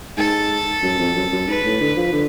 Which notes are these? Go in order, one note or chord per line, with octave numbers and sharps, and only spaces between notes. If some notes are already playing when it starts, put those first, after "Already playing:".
G#2 A4
F#2
F2
F#2
F#2
G#2 B4
A2
D3
F3
D3